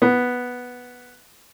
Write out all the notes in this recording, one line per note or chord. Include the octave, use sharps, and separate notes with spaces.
B3